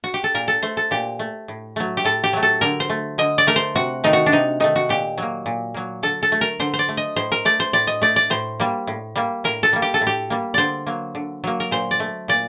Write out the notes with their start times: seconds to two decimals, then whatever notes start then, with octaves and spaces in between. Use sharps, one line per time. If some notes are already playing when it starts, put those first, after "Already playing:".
0.04 F#4
0.14 G4
0.24 A4
0.34 A#2 A#4
0.48 A4
0.62 A3 C5
0.77 A4
0.91 A#2 G4
1.19 A3
1.48 A2
1.76 F#3 A3
1.97 G4
2.04 A2 A4
2.24 G4
2.33 F#3 A3
2.43 A4
2.61 D3 A#4
2.80 C5
2.90 A3
3.18 D3 D#5
3.38 D5
3.47 A3 A#4
3.56 C5
3.76 C3 F#4
4.04 D#3 A3 D#4
4.13 F#4
4.26 D4
4.32 C3 D#4
4.60 D#3 A3 D#4
4.76 F#4
4.89 A#2 G4
5.18 F#3 A#3
5.46 A#2
5.74 F#3 A#3
6.03 D3 A4
6.23 A4
6.32 A3
6.41 A#4
6.60 D3 C5
6.74 C5
6.79 D5
6.89 A3
6.97 D#5
7.16 A2 C5
7.32 A#4
7.45 A3 D5
7.60 C5
7.73 A2 D5
7.87 D#5
8.02 A3 D5
8.16 D5
8.30 A2 C5
8.60 G3 A#3
8.87 A2
9.16 G3 A#3
9.44 A2 A#4
9.63 A4
9.73 G3 A#3
9.82 G4
9.94 A4
10.01 A2
10.07 G4
10.30 G3 A#3
10.54 D3 C5 D5
10.87 F#3 A#3
11.15 D3
11.44 F#3 A#3
11.60 A#4
11.71 A#2 C5
11.91 D5
12.00 A3
12.28 A#2 D5